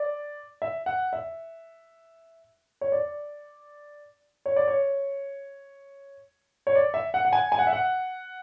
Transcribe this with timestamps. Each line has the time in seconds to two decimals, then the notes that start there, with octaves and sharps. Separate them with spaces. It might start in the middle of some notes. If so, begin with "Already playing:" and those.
Already playing: D5
0.62 E5
0.86 F#5
1.13 E5
2.81 C#5
2.92 D5
4.46 C#5
4.56 D5
4.68 C#5
6.67 C#5
6.75 D5
6.94 E5
7.14 F#5
7.25 F#5
7.33 G#5
7.52 G#5
7.59 F#5
7.67 E5
7.73 F#5